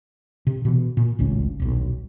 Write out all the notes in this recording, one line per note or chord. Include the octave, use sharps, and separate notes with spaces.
C3
B2 E3
A#2
D1 G#1 C#2 C#4
D#1 B1